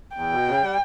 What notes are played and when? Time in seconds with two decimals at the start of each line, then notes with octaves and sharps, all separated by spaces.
0.16 E2 G5
0.32 B2
0.48 C#3
0.63 G3